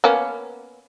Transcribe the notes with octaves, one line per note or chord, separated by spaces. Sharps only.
A#3 B3 C#4